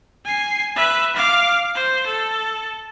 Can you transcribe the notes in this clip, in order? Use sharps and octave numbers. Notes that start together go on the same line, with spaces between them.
G#5 C7
B4 E5
F5 D6
C5
A4